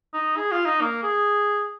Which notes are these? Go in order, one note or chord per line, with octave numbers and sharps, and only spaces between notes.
D#4
G#4
F4
D#4
A#3
G#4